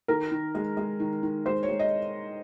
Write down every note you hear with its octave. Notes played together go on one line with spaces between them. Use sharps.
D#3 A#4
D#3
G#3
G#3
D#3
D#3
G#3 C5
C#5
G#3
D#5